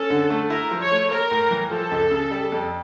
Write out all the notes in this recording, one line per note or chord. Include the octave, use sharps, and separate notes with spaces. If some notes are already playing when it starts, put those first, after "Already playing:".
Already playing: C#4 A4
D3
A3
E4 A#4
F3
C#5
A3
A#3 A#4
A2
E3
F3 A4
C#2
C#3
G3
F2